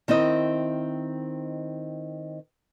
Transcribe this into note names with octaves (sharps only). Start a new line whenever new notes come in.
D#3 C4 E4 D#5